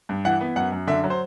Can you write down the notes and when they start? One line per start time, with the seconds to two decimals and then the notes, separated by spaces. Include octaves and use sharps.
0.09 G2
0.25 E3 F#5
0.41 B3
0.56 F#2 F#5
0.72 F#2
0.87 D3 E5
1.04 F#3
1.10 C5